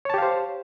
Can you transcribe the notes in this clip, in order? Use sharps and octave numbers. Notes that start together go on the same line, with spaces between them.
G4 C5 C#5 F5 A5